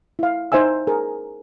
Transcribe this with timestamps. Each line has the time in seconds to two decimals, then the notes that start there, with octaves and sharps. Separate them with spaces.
0.19 E4 F5
0.52 D#4 C5 E5 G#5 E6
0.87 G#4 A#4